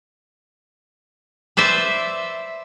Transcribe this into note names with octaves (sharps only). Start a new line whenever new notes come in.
B4 C5 D5 E5